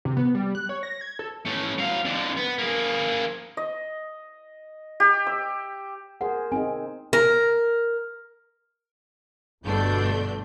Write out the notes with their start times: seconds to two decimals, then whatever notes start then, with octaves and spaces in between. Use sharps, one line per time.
0.05 C3
0.17 B3
0.35 G3
0.55 F#6
0.69 C#5
0.83 A#6
1.01 G#6
1.19 A4
1.45 A3 C#4
1.78 F#3 F5
2.05 F2 D3
2.37 B3
2.59 A#3 G#4
3.57 D#5
5.00 G4
5.27 E6
6.21 G#4 A#4 C5 F#5
6.52 C4 D#4 G#4 G#5
7.13 A#4
9.63 G1 G2 B2 A3 D4 G6